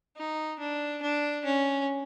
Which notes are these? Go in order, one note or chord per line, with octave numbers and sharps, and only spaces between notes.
D#4
D4
D4
C#4